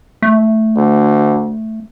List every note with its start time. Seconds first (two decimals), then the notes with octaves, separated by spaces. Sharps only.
0.22 A3
0.77 D2